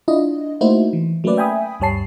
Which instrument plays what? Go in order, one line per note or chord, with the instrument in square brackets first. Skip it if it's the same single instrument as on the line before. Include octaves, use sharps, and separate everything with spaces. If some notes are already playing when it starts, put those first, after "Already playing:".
[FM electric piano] D4 E4 F4 D#5
A3 A#3 D#4 E4 F#4 C5
E3
F#3 A3 A#3 C#4 B4 D5
E5 G5 G#5 B5 D#6
D2 G2 G3 C#5 A5 C7